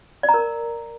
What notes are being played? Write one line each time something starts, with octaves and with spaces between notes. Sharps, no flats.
D5
A#5
A#4